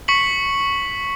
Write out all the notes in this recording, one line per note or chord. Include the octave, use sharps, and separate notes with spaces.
C#6 B6 C#7 F#7